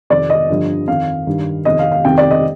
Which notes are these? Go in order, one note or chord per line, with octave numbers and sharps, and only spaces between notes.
F2 C3 D#3 D5
D#5
G2 D3 F3
F2 D#3 F5
G2 D#3
F2 C3 D#3 D#5
F5
F5
F2 C3 D#3 G5
D5
D#5